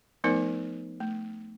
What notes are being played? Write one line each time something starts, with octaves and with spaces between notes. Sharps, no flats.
F3 A3 B3 D#4 A#4 C5
A3